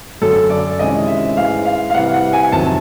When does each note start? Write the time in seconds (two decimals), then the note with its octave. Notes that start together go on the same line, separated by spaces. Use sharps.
0.22 F#2 D3 F#3 A4
0.50 D5
0.79 C3 D#3 G#3 C#4 E4 D#5
1.08 E5
1.37 G#2 E3 G#3 F5
1.66 F5
1.90 F5
1.94 C3 E3 G3 F#5
2.14 F#5
2.33 G#5
2.52 F2 C3 D#3 F#3 A5